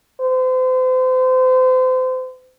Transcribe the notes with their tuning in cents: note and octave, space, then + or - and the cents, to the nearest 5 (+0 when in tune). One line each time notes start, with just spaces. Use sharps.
C5 -35